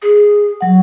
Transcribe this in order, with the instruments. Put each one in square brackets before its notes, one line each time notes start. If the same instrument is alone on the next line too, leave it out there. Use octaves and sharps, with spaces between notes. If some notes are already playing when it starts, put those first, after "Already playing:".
[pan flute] G#4
[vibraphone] F#3 F#5